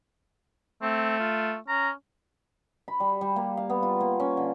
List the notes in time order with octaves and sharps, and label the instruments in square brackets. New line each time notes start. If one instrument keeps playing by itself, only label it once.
[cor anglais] A3 [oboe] C4
[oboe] F4
[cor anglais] C#4 [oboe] A#5
[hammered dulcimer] B5
G3
G3
A#3
F5
B3
F4
A#3
C#4
D3